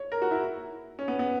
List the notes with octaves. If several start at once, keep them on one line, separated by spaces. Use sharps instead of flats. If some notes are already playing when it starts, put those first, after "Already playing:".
Already playing: C#5
A#4
F#4
E4
C#4
B3
B3